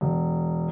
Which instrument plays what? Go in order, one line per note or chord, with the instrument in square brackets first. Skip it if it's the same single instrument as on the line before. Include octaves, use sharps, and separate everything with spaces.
[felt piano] E1